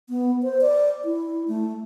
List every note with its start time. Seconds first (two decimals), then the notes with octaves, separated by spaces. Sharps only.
0.09 B3
0.43 C5
0.61 D5
1.04 E4
1.48 A3